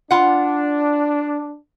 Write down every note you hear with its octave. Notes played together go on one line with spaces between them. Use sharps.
D4 F4 F#5